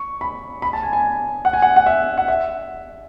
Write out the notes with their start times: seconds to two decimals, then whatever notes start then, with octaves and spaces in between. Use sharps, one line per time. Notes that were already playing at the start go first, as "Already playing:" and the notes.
Already playing: C#6
0.21 B5
0.62 B5
0.73 A5
0.83 G#5
0.93 G#5
1.45 F#5
1.53 G#5
1.62 F#5
1.76 F#5
1.86 E5
2.18 F#5
2.28 E5